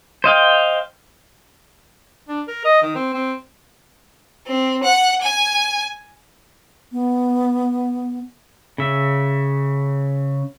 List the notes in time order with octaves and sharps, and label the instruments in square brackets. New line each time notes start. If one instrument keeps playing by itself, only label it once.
[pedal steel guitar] C5 D#5 F5 G5
[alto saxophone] D4
A#4
D#5
D#3
C4
C4
[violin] C4
F#5
G#5
[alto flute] B3
[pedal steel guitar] C#3 E5